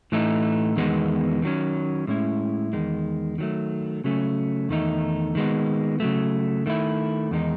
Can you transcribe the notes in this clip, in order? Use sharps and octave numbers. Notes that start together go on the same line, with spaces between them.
A2 E3 A3 D#4
E2 D#3 G#3 B3
D#3 F#3 C#4
A2 G#3 C#4 E4
E2 D#3 G#3
D#3 F#3 A3
C#3 F#3 A3 C#4
E2 D#3 A3 D#4
D#3 G#3 B3
C#3 F#3 A3
D#3 A3 E4
E2 D#3 G#3 D#4